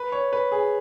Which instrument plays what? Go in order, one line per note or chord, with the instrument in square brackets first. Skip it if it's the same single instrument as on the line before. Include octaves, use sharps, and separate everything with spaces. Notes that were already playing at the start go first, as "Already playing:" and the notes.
Already playing: [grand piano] B4
C#5
B4
G#4